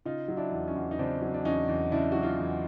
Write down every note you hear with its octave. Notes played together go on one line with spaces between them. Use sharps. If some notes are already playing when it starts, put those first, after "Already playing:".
C#3 D#4 F4
F#3
D4 E4
E2
C#4 D#4
E2
D#4
C#3 C4 D4
F#3
D4
E2 C#4 D#4
E2
C#3 D4 E4
F#3 F#4
D#4 F4
E2